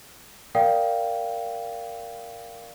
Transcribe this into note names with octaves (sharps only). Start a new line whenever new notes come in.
A#4 D5 F5 G5